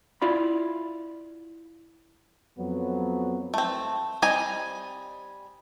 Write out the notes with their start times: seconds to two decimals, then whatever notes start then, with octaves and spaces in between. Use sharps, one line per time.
0.22 E4 F4 D5 B5
2.59 F2 F#3 B3
3.54 A3 C4
4.22 G3 C4 D#4 G#5 A#5